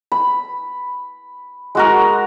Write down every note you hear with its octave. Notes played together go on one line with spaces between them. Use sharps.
B5
G#3 F#4 A#4